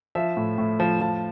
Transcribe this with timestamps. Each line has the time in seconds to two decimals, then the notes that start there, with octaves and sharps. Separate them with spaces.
0.15 F3 E5
0.37 A2
0.58 A2
0.80 F3
1.01 F3 A5